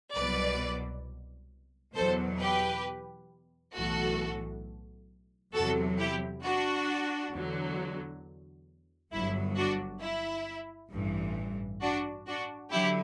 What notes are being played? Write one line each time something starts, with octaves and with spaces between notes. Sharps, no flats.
C2 B2 F#3 B4 D5
E2 B2 F#3 A4 C5
G4 B4
B1 A2 E3 F#4 A4
E2 C3 F#3 F#4 A4
E4 G4
D4 F#4
E2 D3 F#3
G1 G2 F#3 E4
D4 F#4
E4
A1 G2 E3
D4 F#4
D4 F#4
D3 F#3 E4 G4